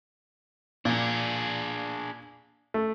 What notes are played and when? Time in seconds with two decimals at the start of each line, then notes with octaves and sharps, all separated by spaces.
0.85 A#2 D4 G#4
2.74 A3